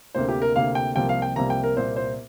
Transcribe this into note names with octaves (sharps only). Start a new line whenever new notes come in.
D2 C3 A#3 C5
G4
A#4
D2 C3 A#3 F5
G5
C2 C3 F3 A#3 G5
F5
G5
C2 C3 F3 A#3 A#5
G5
A#4
C2 A#2 A#3 C5
C5